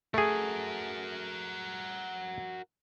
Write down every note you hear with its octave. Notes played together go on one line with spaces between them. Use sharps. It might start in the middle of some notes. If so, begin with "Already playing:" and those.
A3 F#4 G#4 A#4